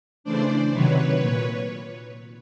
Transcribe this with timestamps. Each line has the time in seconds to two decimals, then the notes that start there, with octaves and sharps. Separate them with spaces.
0.24 C#3 E3 A3 D4 C5 D5
0.73 C3 D#3 F#3 B4 C#5
1.21 A#2